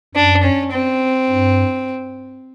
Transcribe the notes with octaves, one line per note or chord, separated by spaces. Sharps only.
F#2 D4
C#4
C4
G2